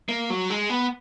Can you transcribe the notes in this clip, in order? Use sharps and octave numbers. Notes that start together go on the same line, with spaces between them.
A#3
F#3
G#3
B3